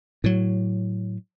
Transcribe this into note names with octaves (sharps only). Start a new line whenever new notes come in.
A2 F#3